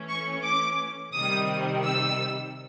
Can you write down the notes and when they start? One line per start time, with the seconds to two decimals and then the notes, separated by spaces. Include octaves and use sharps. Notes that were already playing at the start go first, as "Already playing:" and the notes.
Already playing: E3 A3 C#4
0.09 C#6
0.43 D6
1.13 C3 D#3 G3 D#6
1.84 E6